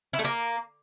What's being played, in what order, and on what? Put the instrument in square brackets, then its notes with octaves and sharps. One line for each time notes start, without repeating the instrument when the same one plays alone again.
[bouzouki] E4
A3
A#3